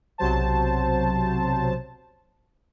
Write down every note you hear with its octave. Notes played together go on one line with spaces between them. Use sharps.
B1 C3 F#3 C5 A5